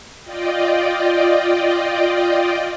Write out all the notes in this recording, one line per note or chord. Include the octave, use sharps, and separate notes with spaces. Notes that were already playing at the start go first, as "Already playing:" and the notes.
F4 D5 D#5 G5